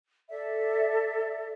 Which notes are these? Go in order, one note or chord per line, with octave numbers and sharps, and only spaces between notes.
A4 D5 E5